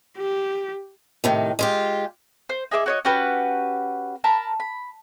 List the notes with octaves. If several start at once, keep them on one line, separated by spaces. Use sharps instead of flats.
G4
A2 C3 D#3
G#3 F4 G4
C5
D#4 G#4 E5 D6
F#4 C#5 D#5
C#4 F#4 G4 B4
A#4 A5 B5
B5